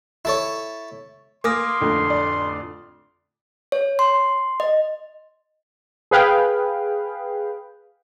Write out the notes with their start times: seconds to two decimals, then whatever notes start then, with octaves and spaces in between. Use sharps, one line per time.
0.25 E4 A4 C#5
1.44 A#3 G#5 C6 D6 D#6 F6 A#6
1.81 A1 F2 D3
2.10 D5
3.72 C#5
3.99 C6
4.60 D#5
6.11 G#4 B4 F5 G5